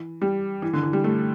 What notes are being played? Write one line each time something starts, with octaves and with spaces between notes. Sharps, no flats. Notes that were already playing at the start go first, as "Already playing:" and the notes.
Already playing: E3
G3
E3
D3
E3
G3
A3